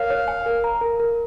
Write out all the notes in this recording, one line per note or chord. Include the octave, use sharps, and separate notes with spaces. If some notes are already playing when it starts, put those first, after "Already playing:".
Already playing: A#4 C#5 F5
C#5
G#5
A#4
A#5
A#4
A#4